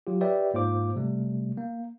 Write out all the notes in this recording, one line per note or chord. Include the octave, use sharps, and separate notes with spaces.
F#3 F4 G4
G4 B4 C#5 D5 E5 G5
G#2 A#3 F4 C5 D6
C3 G3 A3
A#3